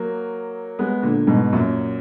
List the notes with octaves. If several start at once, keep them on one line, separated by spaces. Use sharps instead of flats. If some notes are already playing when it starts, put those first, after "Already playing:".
Already playing: F#3 A#3
G#3 B3
A#2 D3
G#2 B2
F#2 A#2